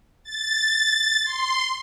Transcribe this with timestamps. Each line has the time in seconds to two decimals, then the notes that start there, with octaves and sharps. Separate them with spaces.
0.23 A6
1.24 C6